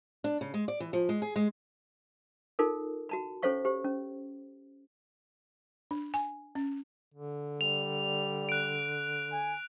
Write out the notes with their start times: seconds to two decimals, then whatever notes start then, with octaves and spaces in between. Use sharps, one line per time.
0.24 D4
0.41 C#3
0.54 G#3
0.68 D5
0.80 E3
0.93 F3
1.09 G#3
1.22 G#4
1.36 G#3
2.59 D#4 F4 A4 A#4
3.09 F#4 A5 B5
3.42 C#4 A4 C5 C#5 F5 C#6
3.65 G4 C5
3.85 C#4
5.91 D4
6.14 G#5
6.55 C#4
7.14 D3
7.61 G3 F7
8.49 F#6 D7
9.32 G#5